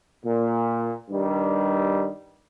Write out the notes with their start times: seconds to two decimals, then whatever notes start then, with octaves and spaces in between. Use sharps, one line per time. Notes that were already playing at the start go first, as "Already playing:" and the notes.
0.24 A#2
1.09 G2 D#3 G3